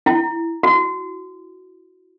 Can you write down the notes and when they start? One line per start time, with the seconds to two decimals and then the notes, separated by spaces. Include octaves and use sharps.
0.06 E4
0.63 F#4